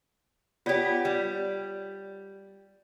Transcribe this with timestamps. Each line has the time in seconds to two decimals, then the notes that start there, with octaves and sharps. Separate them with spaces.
0.66 B3 F4 G4 C#5 D5
1.05 G3